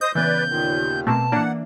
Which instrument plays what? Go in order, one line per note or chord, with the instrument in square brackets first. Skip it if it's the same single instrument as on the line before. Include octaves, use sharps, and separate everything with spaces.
[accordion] C5 D#5 [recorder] D#6 [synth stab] G6
[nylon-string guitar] C#3 B3 [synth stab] E3 [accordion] B4 D5 [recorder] G6
[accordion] D#2 A#2 D#3
[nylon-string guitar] B2 [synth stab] A3 A#3 C4 [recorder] A5
[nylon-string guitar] E3 D5 [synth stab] A#3 D4 [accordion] F#5